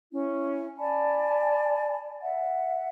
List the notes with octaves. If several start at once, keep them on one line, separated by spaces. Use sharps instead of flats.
C#4 E4
D5 G#5 A5 B5
E5 F#5